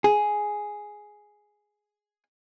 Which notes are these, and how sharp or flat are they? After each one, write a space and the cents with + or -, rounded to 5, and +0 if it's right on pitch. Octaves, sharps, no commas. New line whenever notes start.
G#4 +5